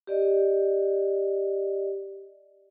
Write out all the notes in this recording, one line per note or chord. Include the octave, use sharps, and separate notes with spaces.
G4 D5 D#5